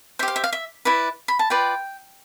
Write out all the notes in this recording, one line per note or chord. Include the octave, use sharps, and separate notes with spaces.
G4 C5 E5
F5
E5
F5
E5
E4 B4 D5
B5
A5
F4 B4 D5 G5